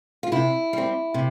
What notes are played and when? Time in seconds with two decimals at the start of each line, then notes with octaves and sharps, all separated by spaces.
0.23 F4
0.32 C3 E4
0.73 G3 C4
1.14 C3